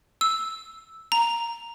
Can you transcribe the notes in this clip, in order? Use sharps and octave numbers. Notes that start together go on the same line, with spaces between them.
E6
A#5